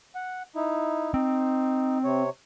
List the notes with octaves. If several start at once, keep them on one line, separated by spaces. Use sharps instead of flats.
F#5
D#4 E4
C4 D#4
C3 C#5